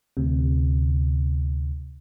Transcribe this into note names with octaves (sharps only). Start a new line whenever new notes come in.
D2 C3